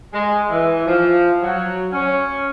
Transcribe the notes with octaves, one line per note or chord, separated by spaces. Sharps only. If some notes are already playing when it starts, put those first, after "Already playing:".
G#3
E3
F3
F#3
C#4